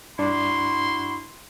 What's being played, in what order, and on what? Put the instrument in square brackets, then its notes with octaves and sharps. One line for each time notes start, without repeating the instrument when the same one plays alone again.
[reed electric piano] G2 D4 [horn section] E4 F#4 C6